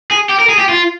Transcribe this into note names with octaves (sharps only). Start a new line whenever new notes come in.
G#4
G4
A#4
G#4
G4
F4